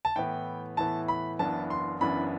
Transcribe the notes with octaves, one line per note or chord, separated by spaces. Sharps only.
A5
A2 E3 B3 G5
A2 E3 B3 A5
B5
F#1 F#2 E3 B3 D4 A5
C6
F#1 F#2 E3 B3 D4 B5